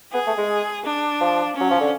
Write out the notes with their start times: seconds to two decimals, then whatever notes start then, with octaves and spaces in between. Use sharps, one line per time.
0.14 B3 G#4
0.27 A3
0.38 G#3
0.85 D4
1.21 F3
1.56 C#4
1.61 F#3
1.71 F3
1.81 D3